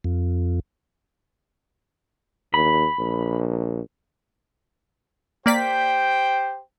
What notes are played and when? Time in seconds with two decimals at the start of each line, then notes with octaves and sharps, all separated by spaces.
0.04 F2
2.54 D#2 B5
2.99 A#1
5.46 A#3 G4 C5 D5 G5 B6